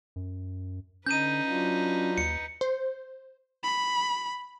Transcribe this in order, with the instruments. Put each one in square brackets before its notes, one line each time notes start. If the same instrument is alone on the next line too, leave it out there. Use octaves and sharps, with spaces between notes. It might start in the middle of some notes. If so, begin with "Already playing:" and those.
[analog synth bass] F#2
[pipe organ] D3 [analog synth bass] C#4 [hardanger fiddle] D#4 B4 [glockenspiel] G6 D#7
[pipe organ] F#3 D4 F4
[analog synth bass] D#2 [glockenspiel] C#7
[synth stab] C5
[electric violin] B5